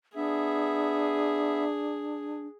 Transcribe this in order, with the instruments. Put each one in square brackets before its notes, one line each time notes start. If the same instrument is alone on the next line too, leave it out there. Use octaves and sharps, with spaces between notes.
[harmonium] B3 E5 [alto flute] D4 [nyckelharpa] G#4